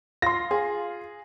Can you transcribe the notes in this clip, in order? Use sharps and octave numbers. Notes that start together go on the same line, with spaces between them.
F4 C6 A#6
G#4